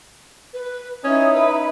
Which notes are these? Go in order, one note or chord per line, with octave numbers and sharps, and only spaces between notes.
B4
C#4 D#4 E4 D#6
B4 B5